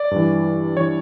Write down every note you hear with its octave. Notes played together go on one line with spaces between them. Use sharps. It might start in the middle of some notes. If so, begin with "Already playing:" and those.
Already playing: D5
G2 E3
E3 C#5